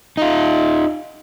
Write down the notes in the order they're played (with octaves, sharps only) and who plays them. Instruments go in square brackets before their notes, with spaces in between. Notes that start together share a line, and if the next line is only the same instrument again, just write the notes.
[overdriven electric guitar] D#4 F4